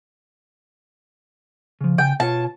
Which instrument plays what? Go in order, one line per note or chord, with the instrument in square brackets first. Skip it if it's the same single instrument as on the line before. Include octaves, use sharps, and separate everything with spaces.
[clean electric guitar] C#3 F3
[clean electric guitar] C#3 G#5 [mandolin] G5
[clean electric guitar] B2 F4 C#5 [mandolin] A5